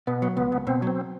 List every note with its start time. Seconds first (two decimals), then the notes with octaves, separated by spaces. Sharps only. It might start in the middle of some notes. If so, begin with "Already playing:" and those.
0.07 B2 B3
0.22 F#3
0.37 C#2 B3
0.52 C#2
0.67 B2 C4
0.82 F#3 C4